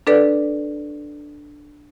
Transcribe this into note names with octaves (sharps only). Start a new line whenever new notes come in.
D4 A4 B4 D5